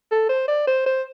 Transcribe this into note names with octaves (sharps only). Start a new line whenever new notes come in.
A4
C5
D5
C5
C5